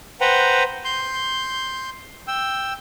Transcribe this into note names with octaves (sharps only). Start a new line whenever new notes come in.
B4 C5 F#5 G5 A#5
C6 G6
G5 E6